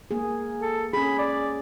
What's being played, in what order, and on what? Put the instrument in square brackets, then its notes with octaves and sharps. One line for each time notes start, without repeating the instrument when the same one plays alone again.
[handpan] A#3 G#4
[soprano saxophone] A4
[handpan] C#4 G#4 [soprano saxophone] B5
[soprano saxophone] D5